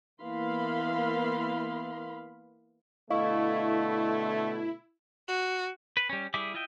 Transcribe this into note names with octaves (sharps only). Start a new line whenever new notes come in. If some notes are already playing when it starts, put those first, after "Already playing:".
E3 A#3 B3 F5 B5 C6
B2 D3 A3 E4 D#5 F5 C#6
F#4
B4
G3 C#4
G3 E4 G#4 E5 D6
E4 F4 D#5 E5 G5